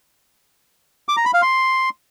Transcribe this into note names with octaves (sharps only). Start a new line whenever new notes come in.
D6
A#5
B5
F5
C6